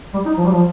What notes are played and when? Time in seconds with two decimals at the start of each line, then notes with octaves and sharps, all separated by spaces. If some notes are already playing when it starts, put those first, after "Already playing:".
0.14 G3
0.26 D#4
0.37 F3
0.45 G3
0.52 F3